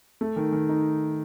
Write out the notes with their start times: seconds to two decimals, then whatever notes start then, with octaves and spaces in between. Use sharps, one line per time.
0.21 A3
0.36 D#3
0.52 D#3
0.69 D#4